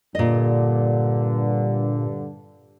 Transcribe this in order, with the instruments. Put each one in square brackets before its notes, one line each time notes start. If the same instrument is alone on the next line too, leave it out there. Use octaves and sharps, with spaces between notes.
[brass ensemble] G2 D3 [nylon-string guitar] A#2 D#5